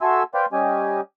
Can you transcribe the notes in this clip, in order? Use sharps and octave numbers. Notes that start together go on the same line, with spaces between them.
F#4 A4 E5 G#5 C6 E6
B4 C5 D5 F5 G5 C6
G3 C#4 G4 D#5 G#5